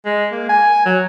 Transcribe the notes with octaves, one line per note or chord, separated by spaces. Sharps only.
G#3
A#3
G#5
F#3